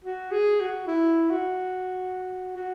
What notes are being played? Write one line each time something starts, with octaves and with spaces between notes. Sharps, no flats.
F#4
G#4
F#4
E4
F#4
F#4